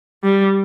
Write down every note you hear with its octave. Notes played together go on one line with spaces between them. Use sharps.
G3